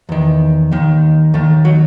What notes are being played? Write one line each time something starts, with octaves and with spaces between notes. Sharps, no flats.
E2 D#3
D#2 D#3
D#2 D#3 A3
F#3